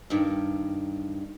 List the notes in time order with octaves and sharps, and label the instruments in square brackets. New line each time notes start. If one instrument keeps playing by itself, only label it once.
[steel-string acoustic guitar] G2 D#3